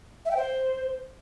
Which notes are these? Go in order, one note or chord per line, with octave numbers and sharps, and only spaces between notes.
E5
G5
C5